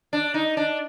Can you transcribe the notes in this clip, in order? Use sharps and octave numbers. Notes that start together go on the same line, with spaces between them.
D4
D#4
D4